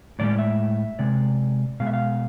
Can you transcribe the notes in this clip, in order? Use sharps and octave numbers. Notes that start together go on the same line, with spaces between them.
A2 E3 G#3 D5
E5
C3 G#3 D5
B2 G#3 F5
E5
F5